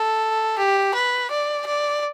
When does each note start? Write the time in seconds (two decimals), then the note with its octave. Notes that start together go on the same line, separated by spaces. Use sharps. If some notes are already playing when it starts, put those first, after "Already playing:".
Already playing: A4
0.58 G4
0.94 B4
1.31 D5
1.66 D5